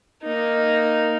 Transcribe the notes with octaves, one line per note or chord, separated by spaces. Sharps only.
A#3 D#4